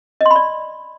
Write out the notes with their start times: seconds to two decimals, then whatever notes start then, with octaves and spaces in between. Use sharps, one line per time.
0.21 D#5
0.26 C6
0.31 B5
0.36 D5